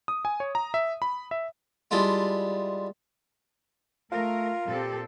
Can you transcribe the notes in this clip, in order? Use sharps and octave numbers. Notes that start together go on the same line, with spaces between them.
D#6
G#5
C#5
A#5
E5
B5
E5
G3 G#3 D4 E4 F4
A3 F4 A#4
A#2 C4 G4 A4